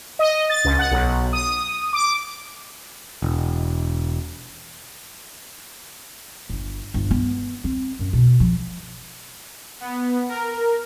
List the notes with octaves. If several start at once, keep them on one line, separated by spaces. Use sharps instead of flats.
D#5
A6
C#2
F#5
B1
D#6
D6
E1
G1
G1
B3
C4
F#2
B2
F3
B3
A#4